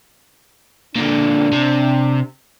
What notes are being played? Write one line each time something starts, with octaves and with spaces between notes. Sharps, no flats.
A#2 D3 D4
C3